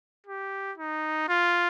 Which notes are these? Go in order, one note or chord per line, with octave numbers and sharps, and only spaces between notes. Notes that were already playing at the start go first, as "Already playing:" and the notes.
G4
D#4
F4